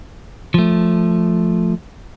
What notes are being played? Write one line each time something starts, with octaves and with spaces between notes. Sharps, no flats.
F3 A3